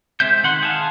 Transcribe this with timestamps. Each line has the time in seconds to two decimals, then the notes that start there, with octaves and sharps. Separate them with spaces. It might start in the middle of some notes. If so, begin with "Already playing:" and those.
0.20 G#3 C4 E5 G6
0.43 D#3 F#5 C6
0.63 G#4 F5 A5